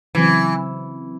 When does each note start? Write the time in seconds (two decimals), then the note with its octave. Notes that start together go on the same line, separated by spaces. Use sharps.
0.15 C#3 E3 F#3 C4